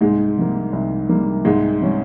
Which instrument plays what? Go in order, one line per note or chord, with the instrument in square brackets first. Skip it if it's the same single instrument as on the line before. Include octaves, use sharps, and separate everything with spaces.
[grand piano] C2 [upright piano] G#2 G#3
[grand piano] C3 G3 A#3
C2
C3 G3 A#3
[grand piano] C2 [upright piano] G#2 G#3
[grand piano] C3 G3 C#4